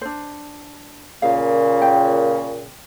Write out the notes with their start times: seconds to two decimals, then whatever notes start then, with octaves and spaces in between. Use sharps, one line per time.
0.01 D4 C5
1.22 A#2 C#3 F5
1.82 G5